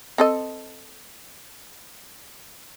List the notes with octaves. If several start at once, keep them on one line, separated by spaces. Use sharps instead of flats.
C4 A4 D#5